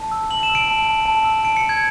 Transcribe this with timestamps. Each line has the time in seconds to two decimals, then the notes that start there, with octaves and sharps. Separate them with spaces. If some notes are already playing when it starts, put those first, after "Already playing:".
Already playing: A5
0.12 E6
0.31 A5 F#7
0.43 E7
0.50 E6
0.55 D7
0.68 A5
0.87 A5
1.06 A5
1.25 E6
1.44 A5 D7
1.57 C#7
1.64 A5
1.69 G#6